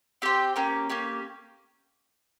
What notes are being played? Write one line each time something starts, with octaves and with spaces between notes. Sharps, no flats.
C4 G4 C5 G5
A#3 C#4 G4
A#3 C#4 G4